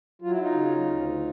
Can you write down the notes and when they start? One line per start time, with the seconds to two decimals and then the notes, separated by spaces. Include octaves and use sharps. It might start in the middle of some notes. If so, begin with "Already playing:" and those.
0.22 F#3 F4
0.31 E4
0.41 D#4 F4
0.53 C#3
0.85 D2
1.16 C#3